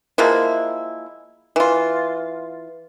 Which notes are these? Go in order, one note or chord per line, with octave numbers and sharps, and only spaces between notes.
F3 G#3 A#3 E4
E3 F4